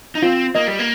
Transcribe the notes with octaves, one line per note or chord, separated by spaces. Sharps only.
D#4
C4 F4
A#3 D#5
G3
A#3